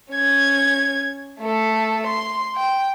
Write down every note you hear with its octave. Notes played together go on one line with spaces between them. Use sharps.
C#4 G#6
A3 A4
C6
G5